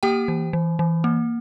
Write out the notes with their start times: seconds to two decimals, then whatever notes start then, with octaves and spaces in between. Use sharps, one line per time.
0.03 A#3 G4 G5
0.28 E3
0.53 E3
0.79 E3
1.04 A#3